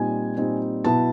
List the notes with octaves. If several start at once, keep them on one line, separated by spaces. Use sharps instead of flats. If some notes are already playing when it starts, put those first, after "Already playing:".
Already playing: A#2 G3 C4 D#4 G#5
A#2 G3 C4 D#4
B2 F#3 B3 E4 A5